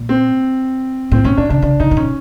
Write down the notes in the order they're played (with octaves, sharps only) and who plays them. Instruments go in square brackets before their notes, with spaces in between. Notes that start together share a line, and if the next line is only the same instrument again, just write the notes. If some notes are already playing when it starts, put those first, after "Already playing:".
Already playing: [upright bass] A#2
[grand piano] C4
[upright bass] A2 [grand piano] C4
[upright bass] A#2 [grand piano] C#4
[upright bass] A#2 [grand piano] D4
[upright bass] C3 [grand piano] D4
[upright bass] C#3 [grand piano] D4
[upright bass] C#3 [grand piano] D#4
[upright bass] C3
[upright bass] B2 [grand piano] C#4